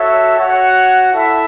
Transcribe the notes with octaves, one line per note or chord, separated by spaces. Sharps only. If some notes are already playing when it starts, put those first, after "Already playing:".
Already playing: F#4 A4 C#5 E5
F#4 C#5 F#5
E4 A4 E5